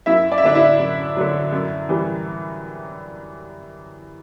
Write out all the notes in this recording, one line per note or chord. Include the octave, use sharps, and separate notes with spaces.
F#2 E4 E5
D5
E5
D3 F#3 D4 D5
E4 E5
F#2
D3 F#3
F#2
E3 G3